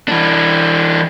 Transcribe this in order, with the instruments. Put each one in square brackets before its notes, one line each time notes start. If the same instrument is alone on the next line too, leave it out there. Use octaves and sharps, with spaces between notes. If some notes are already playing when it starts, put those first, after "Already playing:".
[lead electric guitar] E3 D4